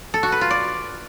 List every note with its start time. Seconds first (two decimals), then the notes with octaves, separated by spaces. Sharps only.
0.14 A4
0.23 F#4
0.32 B4
0.41 F4
0.51 D5